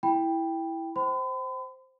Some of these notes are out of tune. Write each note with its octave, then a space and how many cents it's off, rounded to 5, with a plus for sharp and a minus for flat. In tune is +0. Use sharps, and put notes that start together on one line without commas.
E4 +0 G5 +10 B5 +0
C5 +0 G5 -30 B5 +45